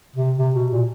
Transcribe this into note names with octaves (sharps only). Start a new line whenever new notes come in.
C3
C3
B2
A#2